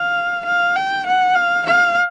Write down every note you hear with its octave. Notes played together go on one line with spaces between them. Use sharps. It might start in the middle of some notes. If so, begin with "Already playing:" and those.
Already playing: F5
F5
G5
F#5
F5
F5